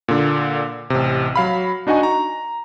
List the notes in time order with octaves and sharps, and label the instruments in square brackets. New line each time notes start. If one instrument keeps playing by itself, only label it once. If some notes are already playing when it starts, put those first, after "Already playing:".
[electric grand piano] A#2 D3
A1 C3
F#3 F5 B5
D4 D#4 F#4 D#5 G#5 C#6
A#5